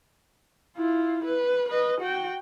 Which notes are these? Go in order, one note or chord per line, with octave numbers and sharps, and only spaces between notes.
E4 F4
B4
B4 D#5
F#4 G5